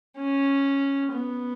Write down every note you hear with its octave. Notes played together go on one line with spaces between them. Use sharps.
C#4
B3